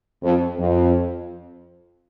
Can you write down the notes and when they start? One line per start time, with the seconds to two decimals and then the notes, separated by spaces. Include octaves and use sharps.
0.22 F2
0.58 F2